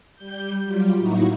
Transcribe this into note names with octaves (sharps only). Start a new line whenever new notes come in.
G3 G6
F#3 G3 F4 G4
A2 F#3 A#3 D#4 E4 F#4